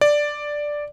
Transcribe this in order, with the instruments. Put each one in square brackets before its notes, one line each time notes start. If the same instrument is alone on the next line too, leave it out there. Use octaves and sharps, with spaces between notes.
[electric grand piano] D5